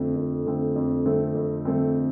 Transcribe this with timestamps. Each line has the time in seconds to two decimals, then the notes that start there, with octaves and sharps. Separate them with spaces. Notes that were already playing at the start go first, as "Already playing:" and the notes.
Already playing: F2 D3 A3 C4
0.16 F2
0.46 D3 A3 C4
0.76 F2
1.06 D3 A3 C4
1.35 F2
1.65 D3 A3 C4